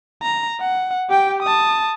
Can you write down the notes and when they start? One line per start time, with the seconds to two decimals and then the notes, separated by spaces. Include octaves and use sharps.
0.22 A#5
0.61 F#5
1.10 G4 G5
1.42 A5 D#6